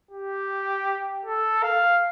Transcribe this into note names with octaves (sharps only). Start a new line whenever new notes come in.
G4
A4
F5